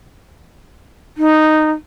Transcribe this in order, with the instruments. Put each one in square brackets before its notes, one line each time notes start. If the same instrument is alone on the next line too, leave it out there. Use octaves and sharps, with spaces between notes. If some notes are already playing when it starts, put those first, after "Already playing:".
[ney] D#4